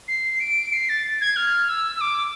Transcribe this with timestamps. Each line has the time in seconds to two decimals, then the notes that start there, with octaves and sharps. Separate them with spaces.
0.08 C7
0.40 D7
0.73 C7
0.89 A6
1.21 G#6
1.36 F6
1.69 E6
1.95 E6
2.01 D6